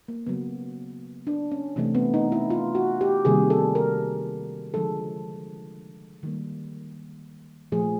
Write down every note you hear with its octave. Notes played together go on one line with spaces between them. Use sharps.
A#3
C#3 F#3 A#3 B3
D4
C#4
C3 E3 A3 C4
B3
D#4
E4
F4
F#4
G4
C3 D#3 G3 A#3 G#4
A4
A#4
D3 F3 G#3 A4
D#3 G3 A#3
A#2 F3 A3 G#4